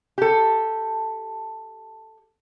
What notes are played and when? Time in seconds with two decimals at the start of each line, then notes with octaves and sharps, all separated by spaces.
0.18 G4 A4